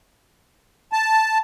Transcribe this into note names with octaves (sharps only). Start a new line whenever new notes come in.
A5